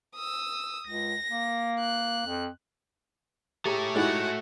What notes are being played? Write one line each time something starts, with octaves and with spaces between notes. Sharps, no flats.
D#6 E6
C#2 A#6
A#3
F#6
F2
A3 G4 G#4 C#5 A#5
G#3 D#4 E4 F#4 F#5